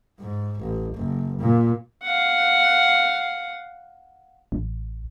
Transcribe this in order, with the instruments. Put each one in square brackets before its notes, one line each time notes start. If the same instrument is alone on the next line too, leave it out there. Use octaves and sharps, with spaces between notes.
[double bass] G#2
A1
F#1
A#2
[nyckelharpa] F5 F#5
[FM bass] A1